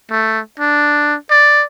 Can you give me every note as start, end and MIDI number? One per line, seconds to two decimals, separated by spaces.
0.10 0.40 57
0.59 1.16 62
1.31 1.64 74